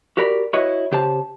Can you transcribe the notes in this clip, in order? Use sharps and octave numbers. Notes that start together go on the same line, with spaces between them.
F#4 G4 A#4 D5 B5
E4 F#4 B4 C#5 D#5
C#3 G4 C5 A5